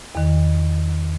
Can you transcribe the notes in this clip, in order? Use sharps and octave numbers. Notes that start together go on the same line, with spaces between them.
E2 D#3